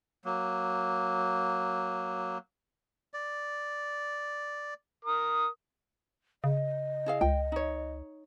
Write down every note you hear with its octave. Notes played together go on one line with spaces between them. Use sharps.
F#3 A#3
D5
A#4 D#6
C#3 D#5
E4 G#4 F5
C#2 G5
D#4 C#5